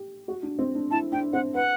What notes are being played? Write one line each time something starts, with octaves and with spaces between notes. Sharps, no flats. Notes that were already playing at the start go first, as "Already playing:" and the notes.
Already playing: G4
F#4
D4
C4
D4
E4 A5
D4 G5
C4 F#5
B4 F#5